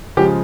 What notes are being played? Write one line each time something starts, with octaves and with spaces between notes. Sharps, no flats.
C#3 F3 G#3 G4